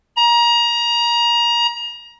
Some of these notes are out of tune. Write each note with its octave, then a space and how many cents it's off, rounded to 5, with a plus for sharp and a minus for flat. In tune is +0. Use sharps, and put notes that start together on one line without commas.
A#5 +25